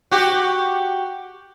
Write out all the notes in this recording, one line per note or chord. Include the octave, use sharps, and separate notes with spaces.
F#4 G4